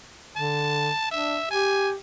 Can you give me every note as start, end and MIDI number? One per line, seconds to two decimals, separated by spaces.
0.36 0.89 50
0.36 1.07 81
1.12 1.37 62
1.12 1.50 76
1.51 1.95 67
1.51 1.91 80